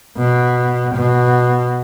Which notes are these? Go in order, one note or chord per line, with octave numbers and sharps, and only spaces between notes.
B2
B2